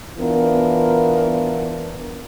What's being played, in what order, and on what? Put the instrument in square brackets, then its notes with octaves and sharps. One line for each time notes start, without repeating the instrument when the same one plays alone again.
[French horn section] E3 B3 D4 F4 A#4